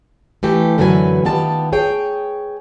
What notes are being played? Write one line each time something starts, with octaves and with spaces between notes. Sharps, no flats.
E3 A3 G4
F#2 D3 E3 F#3 B4 G#5
D#3 B3 F4 G4 A5
G#4 C#5 G5